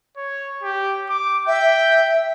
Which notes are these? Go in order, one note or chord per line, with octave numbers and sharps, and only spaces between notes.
C#5
G4
D6
E5 G5